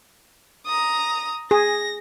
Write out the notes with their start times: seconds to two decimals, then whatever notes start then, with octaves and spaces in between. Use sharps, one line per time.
0.66 A#5 D#6
1.51 G#4 A#6